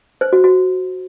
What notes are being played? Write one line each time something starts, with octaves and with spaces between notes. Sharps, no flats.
C5
F#4
F#4